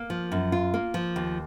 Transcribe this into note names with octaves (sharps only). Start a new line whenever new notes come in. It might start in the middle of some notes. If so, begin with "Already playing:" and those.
Already playing: A#3
F3
F#2
F4
A#3
F3
D#2